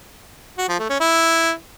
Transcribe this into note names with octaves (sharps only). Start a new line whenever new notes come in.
F#4
F3
A3
C#4
E4